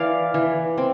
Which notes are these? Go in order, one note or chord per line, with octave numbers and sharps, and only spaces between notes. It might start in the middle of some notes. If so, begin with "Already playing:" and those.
Already playing: E3 D5 F5
E3
C4